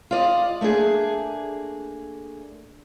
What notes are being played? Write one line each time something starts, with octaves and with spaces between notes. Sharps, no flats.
F4 D5 D#5
A3 A#3 D4 G#4